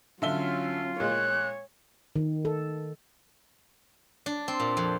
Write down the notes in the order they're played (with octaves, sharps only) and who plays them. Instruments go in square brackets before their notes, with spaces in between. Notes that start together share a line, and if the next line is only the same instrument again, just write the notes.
[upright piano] D3 E5 G7 [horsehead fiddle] F#3 C#4 [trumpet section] F4
[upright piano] A#2 G#3 [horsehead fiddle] C#5 [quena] F#6
[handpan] D#3
A4
[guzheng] D4
C4
A#2
F2